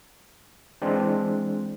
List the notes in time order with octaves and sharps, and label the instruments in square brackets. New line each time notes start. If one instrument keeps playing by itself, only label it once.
[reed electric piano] E3 G#3 C4 D4